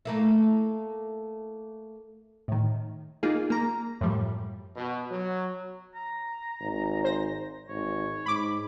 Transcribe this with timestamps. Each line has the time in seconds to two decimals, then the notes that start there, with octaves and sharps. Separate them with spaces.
0.05 A3 A#3 E4
2.48 A2 D#3
3.23 A#3 D#4 F4 G#4
3.50 A#3 A#5
4.01 F#2 A2 F3 G3
4.76 B2
5.11 F#3
5.95 A#5
6.61 G#1
7.04 C5 A#6
7.69 G#1 C#5
8.26 G#2 B5 D6